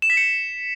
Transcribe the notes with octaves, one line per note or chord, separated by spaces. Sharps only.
E7
B6
C#7